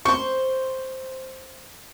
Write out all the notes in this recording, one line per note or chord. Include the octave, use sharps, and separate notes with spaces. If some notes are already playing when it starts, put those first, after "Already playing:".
C5 C#6